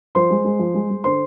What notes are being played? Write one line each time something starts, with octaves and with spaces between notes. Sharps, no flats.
F3 C5 C6
G#3
G#3
F3
G#3
G#3
D3 C5 C6